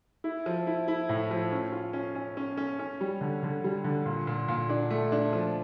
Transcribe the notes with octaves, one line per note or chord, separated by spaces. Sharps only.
E4
F3
E4
E4
A2
F3
C#4
F4
C#4
C#4
C#4
C#4
C#4
G3
D3
D3
G3
D3
A#2
A#2
A#2
D4
A3
D4
F3